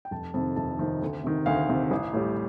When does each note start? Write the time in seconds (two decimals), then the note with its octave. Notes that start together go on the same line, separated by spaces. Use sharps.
0.05 G5
0.11 F1 A5
0.34 F2 C3 D#3 A5
0.56 F1 A5
0.79 F2 C3 D#3
1.02 D2
1.24 C3 D#3
1.46 D2 F5
1.69 C3 D#3
1.91 A1
2.13 A2 G3